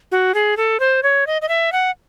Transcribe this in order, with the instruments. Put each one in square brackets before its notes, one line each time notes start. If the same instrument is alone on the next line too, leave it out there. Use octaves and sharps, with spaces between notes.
[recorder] F#4
G#4
A4
C5
C#5
D#5
D#5
E5
F#5